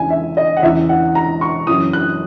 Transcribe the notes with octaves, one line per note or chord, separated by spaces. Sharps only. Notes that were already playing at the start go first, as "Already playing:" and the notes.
Already playing: E2 C#3 E3 G#5
E5
D#5
F#5
E2 C#3 E3 E5
F#5
A#5
C#6
F#2 C#3 E3 D#6
F#6